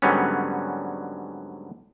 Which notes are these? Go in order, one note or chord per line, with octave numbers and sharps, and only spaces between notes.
G#2 D3 F#3 G3 B3 C#4